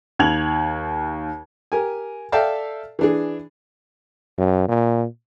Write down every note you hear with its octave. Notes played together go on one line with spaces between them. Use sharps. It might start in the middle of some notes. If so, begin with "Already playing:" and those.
D#2 G#6 F7 F#7
G4 A#4 G#5
A4 D5 E5 F5 G5 A5
E3 D4 G#4
F#2
A#2